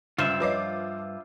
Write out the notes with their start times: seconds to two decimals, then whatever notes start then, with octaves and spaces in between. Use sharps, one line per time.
0.18 C#2 G2 F4 C5 E5
0.40 F3 B4 C#5 D#5 D6 C7